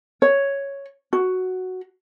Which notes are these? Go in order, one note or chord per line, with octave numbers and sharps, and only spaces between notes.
C#5
F#4